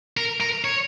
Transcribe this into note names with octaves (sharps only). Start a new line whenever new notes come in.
A#4
A#4
C#5